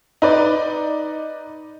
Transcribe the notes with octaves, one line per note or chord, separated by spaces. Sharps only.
D#4 B4 D5